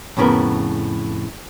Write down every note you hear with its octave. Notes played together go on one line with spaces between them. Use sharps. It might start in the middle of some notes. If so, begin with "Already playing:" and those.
F2 A2 C#3 B3 A#4